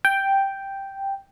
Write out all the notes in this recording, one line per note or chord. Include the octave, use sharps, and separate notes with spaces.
G5